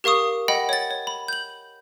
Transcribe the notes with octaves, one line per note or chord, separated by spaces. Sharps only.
G4 A#4 F5 C#6 D#6
D#5 F#5 G5 B5
C#5 A6
C#5
B5
G6 F#7